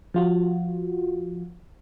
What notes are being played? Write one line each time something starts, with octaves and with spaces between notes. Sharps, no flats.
F3 F4 F#4